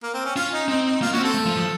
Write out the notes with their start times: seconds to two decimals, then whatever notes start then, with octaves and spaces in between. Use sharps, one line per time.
0.03 A#3
0.14 C4
0.25 C#4
0.36 C#4 F4
0.53 D#4
0.68 C4 D#4
0.86 D#4
1.02 A#3 F4
1.13 C#4 F#4
1.18 C4
1.24 A4
1.34 A3
1.46 F3
1.57 F3